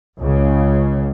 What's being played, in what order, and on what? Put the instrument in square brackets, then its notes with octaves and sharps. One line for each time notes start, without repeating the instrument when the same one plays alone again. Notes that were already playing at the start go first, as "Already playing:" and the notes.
[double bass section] C#2 C#3